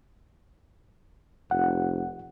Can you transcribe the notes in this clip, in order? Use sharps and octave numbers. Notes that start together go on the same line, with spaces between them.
F1 F#5